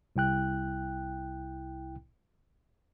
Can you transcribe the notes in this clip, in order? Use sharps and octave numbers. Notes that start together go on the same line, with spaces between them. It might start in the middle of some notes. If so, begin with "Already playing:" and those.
C2 E4 G5 F#6